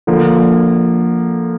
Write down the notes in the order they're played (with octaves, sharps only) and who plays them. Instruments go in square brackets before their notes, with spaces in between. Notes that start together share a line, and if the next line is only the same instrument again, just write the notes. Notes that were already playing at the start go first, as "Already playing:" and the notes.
[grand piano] D3 F3 A#3